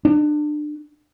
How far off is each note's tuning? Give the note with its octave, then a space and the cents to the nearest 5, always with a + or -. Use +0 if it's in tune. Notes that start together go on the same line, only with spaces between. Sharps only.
D4 +30